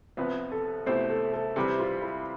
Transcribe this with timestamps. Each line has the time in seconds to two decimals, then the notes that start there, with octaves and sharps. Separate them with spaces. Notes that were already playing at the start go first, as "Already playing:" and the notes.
0.17 C2 C3 F3 B3 B4
0.52 A4
0.86 C2 B2 A3 E4 G4 C5
1.10 A4
1.33 A4
1.56 C3 E3 G3 C4 G4
1.79 F4
2.02 E4